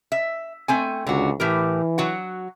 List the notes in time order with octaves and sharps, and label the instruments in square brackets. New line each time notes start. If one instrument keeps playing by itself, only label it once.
[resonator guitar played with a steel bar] E5
A3 C4 G#5
[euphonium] C#2 [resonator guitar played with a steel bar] D3 F#4
[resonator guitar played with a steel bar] A2 G4 A#4 [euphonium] E3
[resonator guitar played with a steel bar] F#3 F#4 F#5